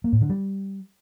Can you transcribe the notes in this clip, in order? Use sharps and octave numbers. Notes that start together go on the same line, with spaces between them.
A#3
A2
D3
G3